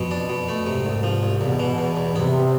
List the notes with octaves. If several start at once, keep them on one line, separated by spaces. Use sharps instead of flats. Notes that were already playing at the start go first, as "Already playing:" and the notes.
Already playing: F2 B2
D4
B2
A3
G#2 C3
C2
F3
C2
E2 B2
E3
E2
E2
C3 B3